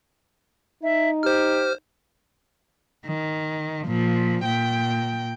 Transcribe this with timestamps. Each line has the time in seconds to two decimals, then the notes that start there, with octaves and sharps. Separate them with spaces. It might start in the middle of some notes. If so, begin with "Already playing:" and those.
0.83 D#4 E5
1.23 G4 C5 F6
3.06 D#3
3.87 A#2 F3
4.45 A#2 G5